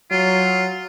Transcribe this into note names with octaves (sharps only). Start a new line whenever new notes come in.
F#3 F4